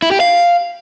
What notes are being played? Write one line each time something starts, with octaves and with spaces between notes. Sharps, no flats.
E4
G4
F5